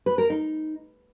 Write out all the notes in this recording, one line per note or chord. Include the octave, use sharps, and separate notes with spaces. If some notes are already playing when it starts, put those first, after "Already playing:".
B4
A#4
D#4